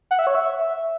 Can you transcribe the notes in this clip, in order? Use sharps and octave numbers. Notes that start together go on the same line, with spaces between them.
F#5
E5
C#5
E5